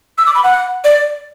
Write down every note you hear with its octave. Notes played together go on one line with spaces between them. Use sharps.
E6
D6
B5
F#5
D5